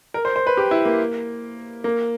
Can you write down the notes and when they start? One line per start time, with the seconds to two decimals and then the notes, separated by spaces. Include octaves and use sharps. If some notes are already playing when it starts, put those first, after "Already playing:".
0.14 A#4
0.25 C5
0.36 C5
0.47 B4
0.57 G4
0.71 E4
0.85 A#3
1.84 A#3